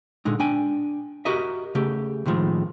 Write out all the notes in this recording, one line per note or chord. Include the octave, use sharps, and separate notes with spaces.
A#2 D3 G#3 D#4
D4 G5 G#5
F#4 G4 A#4 D#5 E5
C#3 A3 G4
C#2 A2 D#3 F3 G#3